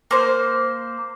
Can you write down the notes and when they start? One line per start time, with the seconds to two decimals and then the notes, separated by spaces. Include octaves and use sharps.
0.11 A#3 C5